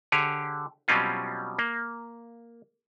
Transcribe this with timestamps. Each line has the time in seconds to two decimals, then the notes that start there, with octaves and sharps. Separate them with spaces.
0.12 D3 G4 G#4 C#5
0.88 B2 F#3 G3 C4 C#4 F4
1.59 A#3